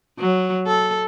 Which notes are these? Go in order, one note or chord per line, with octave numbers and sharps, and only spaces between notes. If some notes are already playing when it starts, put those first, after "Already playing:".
F#3
A4